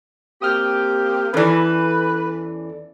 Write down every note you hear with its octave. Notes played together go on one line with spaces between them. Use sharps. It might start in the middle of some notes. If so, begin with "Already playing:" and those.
A#3 C4 G4 D#6 F6 G6
E2 E3 C#4 A4 B4 D5